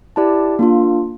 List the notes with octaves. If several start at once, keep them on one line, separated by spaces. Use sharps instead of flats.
E4 G4 D5 A5
A#3 D4 F4